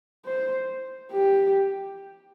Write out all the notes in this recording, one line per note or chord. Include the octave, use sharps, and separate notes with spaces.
C5
G4